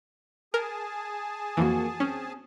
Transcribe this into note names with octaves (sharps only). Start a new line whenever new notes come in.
G#4 A#4 G#5 A5
F2 E3 A#3 F#4
C4 C#4